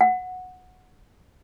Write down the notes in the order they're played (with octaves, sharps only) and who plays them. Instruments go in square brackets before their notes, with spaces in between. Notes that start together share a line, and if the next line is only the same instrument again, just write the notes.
[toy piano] F#5